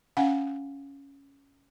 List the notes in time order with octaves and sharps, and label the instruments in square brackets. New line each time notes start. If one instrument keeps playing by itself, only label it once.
[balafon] C#4 F5 F#5 G#5